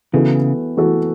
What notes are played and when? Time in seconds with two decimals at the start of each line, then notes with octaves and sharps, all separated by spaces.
0.13 C#3 E3 B3 F#4 A4
0.77 E3 B3 F#4 A4